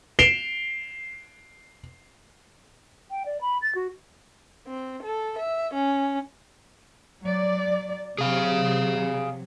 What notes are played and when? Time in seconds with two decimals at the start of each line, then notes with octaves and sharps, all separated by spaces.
0.19 C7 D7 E7 F7 G7
3.11 G5
3.26 D5
3.41 B5
3.62 A6
3.75 F#4
4.66 C4
5.02 A4
5.38 E5
5.74 C#4
7.24 F#3 D5
8.18 C3 F#3 G#4 F5